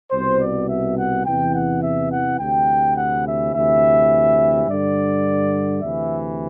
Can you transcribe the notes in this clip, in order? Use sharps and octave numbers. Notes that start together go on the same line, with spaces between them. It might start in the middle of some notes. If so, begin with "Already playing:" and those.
C2 B2 C5
D5
E5
F#5
E2 C3 E3 G5
F#5
E5
F#5
D2 C3 E3 G5
F#5
E5
D2 C3 E3 E5
G2 D3 D5
D2 C3 E3 E5